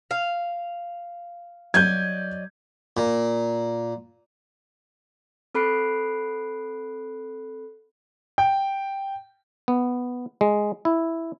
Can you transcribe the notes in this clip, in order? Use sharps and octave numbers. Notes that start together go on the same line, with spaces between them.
F5
F#3 D5 D#5 G6 G#6
A#2
C4 A4 B5 F#6 C7 D7
G5
B3
G#3
E4